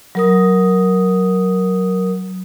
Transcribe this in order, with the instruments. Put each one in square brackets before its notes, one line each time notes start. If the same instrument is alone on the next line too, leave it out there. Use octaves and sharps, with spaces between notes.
[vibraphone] F#3 A#4 D#6